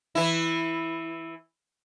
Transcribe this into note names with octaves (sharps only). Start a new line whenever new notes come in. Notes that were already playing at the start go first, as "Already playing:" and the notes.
E3 E4